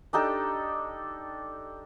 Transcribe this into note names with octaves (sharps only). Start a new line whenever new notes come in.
D4 D#4 G4 A4